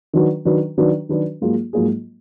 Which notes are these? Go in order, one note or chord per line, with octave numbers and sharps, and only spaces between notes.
D#3 F#3 D4 F#4 B4
D#3 F#3 D4 F#4 B4
D#3 F#3 D4 F#4 B4
D#3 F#3 D4 F#4 B4
G#2 F#3 A#3 F4 G#4
G#2 F#3 A#3 F4 G#4